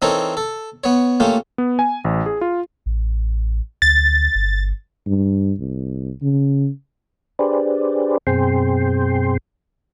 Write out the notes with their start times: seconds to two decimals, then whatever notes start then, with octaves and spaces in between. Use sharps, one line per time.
0.02 E3 C4 D#4 A4 A#4 C#5
0.37 A4
0.84 B3 C#5
1.20 A3 A#3 C#4 F4 G4
1.58 B3
1.79 G#5
2.04 A1
2.26 G#4
2.41 F4
2.86 A1
3.82 D2 A6
4.35 G1
5.06 G2
5.59 C2
6.22 C#3
7.39 D4 G4 G#4 B4 C5 D5
8.27 F#2 B2 C4 G#4 G5 C6